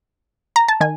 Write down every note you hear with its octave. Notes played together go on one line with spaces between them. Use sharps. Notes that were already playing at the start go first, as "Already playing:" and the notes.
A#5
A5
D#3 G#5